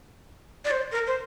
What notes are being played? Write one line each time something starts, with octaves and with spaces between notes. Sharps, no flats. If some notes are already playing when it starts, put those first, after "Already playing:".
D5
C5
A#4
C5